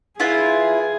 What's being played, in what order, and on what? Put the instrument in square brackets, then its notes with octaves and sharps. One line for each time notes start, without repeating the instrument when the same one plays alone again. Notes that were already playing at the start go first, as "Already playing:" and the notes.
[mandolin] E4 F4 B4 [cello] G#4